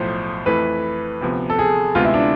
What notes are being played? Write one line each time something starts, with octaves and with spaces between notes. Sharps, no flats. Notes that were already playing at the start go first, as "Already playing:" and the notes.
Already playing: B1 A2 F3 C5
F2 E3 A3 E4 B4
D2 C3 F3 B3
A4
G#4
D2 C3 G#3 B3 F4
E4
D4